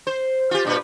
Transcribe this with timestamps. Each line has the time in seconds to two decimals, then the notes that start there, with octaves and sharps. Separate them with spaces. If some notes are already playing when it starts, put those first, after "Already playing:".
0.07 C5
0.51 F4 G4
0.65 G2 A#2 B4